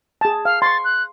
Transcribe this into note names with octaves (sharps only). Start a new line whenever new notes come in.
G#4 A5
F5 F6
C6 C#6 A6
F#6